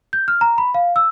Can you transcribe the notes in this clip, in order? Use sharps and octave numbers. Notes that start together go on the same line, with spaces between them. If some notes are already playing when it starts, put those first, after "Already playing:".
G6
F6
A#5
B5
F5
E6